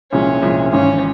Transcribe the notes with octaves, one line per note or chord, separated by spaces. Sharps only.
C2 A#2 F3 G#3 C#4
C2 A#2 F3 G#3
G#1 G#2 E3 C#4